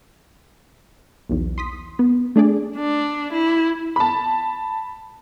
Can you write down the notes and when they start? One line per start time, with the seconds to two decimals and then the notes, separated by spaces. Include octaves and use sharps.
1.29 B1 E2
1.58 C6 D#6 B6
1.99 B3
2.36 A3 D4 G#4 D5
2.77 D4
3.33 E4
3.96 A5 B5